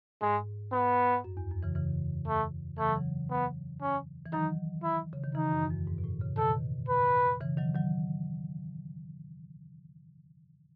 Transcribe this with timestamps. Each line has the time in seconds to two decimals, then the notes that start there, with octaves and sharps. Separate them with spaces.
0.22 G#2 G#3
0.73 B3
1.24 F#2
1.37 E2
1.51 F#2
1.63 C#3 E3
1.75 C#3 E3
2.28 A3
2.78 C#3 E3 A3
2.88 F#3
2.96 C#3 E3
3.30 B3
3.82 C#4
4.26 E3
4.33 D#3 F#3 D#4
4.84 E4
5.13 C#3
5.23 D#3
5.35 C#3 E3 D#4
5.52 F#2
5.64 E2
5.70 F#2
5.87 G#2
5.98 B2
6.04 A2
6.21 C#3
6.37 B2 D#3 A4
6.89 B4
7.41 C#3 E3
7.57 D#3 F#3
7.74 D#3 F#3